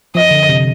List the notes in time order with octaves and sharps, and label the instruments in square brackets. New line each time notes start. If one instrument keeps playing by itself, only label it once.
[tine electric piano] F3 [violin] D#5
[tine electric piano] D3
C3